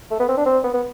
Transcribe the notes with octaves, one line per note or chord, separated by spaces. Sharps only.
A3
B3
C4
D4
C4
B3
B3